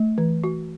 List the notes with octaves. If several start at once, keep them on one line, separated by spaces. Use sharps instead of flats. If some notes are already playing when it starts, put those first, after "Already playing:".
Already playing: A3
E3
F#4